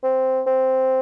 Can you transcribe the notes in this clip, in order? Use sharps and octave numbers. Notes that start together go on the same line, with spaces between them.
C4
C4